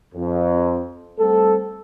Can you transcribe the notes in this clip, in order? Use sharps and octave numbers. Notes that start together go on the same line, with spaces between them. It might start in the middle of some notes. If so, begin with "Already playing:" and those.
F2
G3 A3 C4 A4